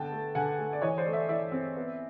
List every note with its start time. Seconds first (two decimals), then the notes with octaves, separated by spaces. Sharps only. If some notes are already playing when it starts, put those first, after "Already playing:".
Already playing: D3 B3 G5 A5
0.12 A3
0.35 D3 F#5 G#5
0.59 A3
0.73 D5
0.82 E3 C#5 D#5
0.98 C5 D5
1.06 A3
1.13 D5 E5
1.29 E3 D5 E5
1.52 C4
1.76 B3